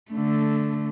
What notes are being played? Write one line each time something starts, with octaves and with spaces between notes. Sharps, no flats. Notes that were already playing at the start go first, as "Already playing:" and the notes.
D3 A3